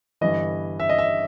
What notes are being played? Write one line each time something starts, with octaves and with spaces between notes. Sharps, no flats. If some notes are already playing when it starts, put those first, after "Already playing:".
G1 G2 E3 D#5
E5
D#5
E5